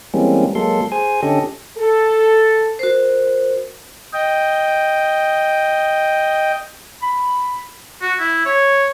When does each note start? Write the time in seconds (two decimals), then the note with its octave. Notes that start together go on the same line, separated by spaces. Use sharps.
0.14 E3 G3 G#3 A#3 C4 C#4
0.55 F#3 G#3 A#3 A4 C6
0.92 G#4 C5 G#5
1.23 D3 C#4 G4 A4 D#5
1.78 A4
2.79 F#4 A#4 C5
4.13 D#5 G5
7.02 B5
8.02 F#4
8.19 E4
8.46 C#5